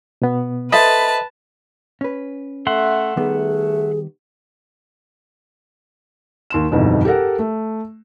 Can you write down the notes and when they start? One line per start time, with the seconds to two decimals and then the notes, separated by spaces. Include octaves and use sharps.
0.22 B2 B3
0.72 A4 B4 C5 D#5 E5 A5 B5
2.01 C#4 B4
2.67 A3 E5 F#5 C6
3.17 D#3 G3 A3 B3 G#4
6.50 D#2 C6 E7
6.71 G1 F2 G#2 B2 E3
7.05 G4 A4 A#4 F#5
7.39 A3